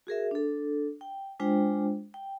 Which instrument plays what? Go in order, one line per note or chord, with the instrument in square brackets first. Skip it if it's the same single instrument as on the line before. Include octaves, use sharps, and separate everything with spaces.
[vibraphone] F#4 G#4 A#4 E5
D4 A4
G5
G#3 D4 F4 C5 G5
G5